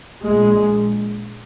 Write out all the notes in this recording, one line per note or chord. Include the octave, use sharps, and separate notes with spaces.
A#1 A#2 G#3